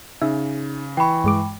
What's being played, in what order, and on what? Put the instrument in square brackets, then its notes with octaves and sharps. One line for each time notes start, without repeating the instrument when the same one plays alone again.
[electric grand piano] C#3 [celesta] D#4 [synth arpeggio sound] E5
[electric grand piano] E3 C#6 [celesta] G5 B5
[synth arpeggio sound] G2 G#3 D6